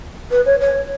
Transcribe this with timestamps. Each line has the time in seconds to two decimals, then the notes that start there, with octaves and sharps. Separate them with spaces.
0.31 B4
0.45 C#5
0.61 C#5